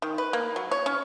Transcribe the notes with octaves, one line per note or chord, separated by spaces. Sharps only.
D#3
B4
A#3
F#3
C#5
C#4